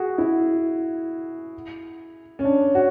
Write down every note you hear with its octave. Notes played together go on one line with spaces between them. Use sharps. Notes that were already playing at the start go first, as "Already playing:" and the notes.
Already playing: F#4 G#4
E4
C#4
D4
F#4